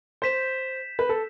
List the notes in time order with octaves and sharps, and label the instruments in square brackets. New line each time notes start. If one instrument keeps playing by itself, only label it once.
[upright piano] C5 [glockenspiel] G6 B6 E7
[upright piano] B4
A4